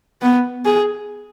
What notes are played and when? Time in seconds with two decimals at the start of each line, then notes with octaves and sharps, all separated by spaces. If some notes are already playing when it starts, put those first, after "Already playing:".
0.22 B3
0.65 G#4